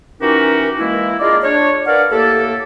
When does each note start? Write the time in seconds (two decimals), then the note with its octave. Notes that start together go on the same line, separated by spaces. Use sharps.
0.21 E3 C#4 D#4 F#4 G4 A#4
0.79 E3 G#3 A#3 E4
1.20 D4 F4 G#4 A#4 D5 D#5
1.43 D4 C#5
1.86 D4 A#4 B4 D5 F5 F#5
2.11 A2 A#3 G4 A4